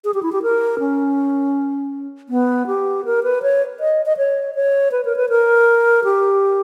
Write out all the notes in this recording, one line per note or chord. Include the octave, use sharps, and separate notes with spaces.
G#4
G4
E4
G4
A#4
C#4
B3
G4
A#4
B4
C#5
D#5
D#5
C#5
C#5
B4
A#4
B4
A#4
G4